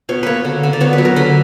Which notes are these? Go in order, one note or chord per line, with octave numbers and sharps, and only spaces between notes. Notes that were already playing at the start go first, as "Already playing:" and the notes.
B2 C#5
A#3 B4 C#5
D3
D3
D5
B3 C#5
B4
F#3
A#4
D3 B4